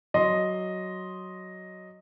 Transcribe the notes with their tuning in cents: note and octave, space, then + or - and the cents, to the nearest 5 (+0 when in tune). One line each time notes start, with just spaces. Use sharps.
F#3 +5 D#5 +0 C6 +0